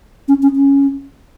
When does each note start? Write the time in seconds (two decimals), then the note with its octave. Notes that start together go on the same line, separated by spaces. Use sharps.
0.28 C#4
0.42 C#4
0.57 C#4